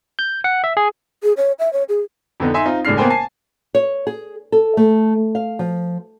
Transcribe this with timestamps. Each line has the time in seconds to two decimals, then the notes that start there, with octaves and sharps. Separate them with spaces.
0.19 G6
0.44 F#5
0.64 E5
0.77 G#4
1.23 G#4
1.37 C#5
1.59 E5
1.73 C#5
1.89 G#4
2.40 F2 D3 B3 D#4
2.54 D#4 E5 G#5 C6
2.66 C4 D#4 F4
2.85 F#1 A2 G#3 D4 F6 C7
2.97 A#3 B3 A#4 C5 G5 G#5
3.10 G#5 A5 C7
3.75 C#5
4.07 G#4
4.52 A4
4.77 A3
5.35 F5
5.59 F3